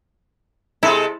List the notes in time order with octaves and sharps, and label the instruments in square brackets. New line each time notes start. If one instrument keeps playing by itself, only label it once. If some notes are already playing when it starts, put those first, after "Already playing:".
[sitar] C3 G#3 A4 [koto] E4